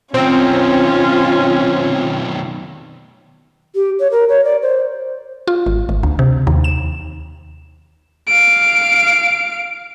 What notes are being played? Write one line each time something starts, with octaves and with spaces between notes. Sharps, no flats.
B1 D#3 C4 C#4 F4
G4
C#5
A#4
C#5
D5
C5
F4
G#1
G#1
D2
C3
D#2
E7
F5 D7